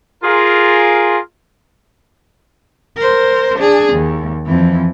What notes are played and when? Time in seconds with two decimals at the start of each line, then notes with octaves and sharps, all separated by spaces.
0.23 F4 G#4 A#4
2.96 A#4 C5
3.58 D4 G#4
3.93 D#2
4.46 F2 E3